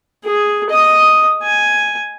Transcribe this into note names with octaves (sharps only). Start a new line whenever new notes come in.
G#4
D#5 D#6
G#5